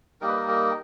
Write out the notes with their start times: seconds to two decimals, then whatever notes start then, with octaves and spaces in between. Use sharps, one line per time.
0.21 G3 A#3 D#4 A#4
0.28 B4
0.36 A#4
0.48 A#4